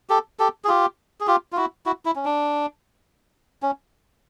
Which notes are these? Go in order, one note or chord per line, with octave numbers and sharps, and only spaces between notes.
G4 A4
G4 A4
G#4
F4 G4
G#4
F4 G4
F4
E4 F#4
E4 F#4
E4
C#4
D4
C#4